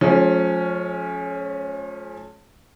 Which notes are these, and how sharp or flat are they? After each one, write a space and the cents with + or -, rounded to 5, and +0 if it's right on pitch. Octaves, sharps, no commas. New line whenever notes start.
F3 +30 A3 -45 C#4 +0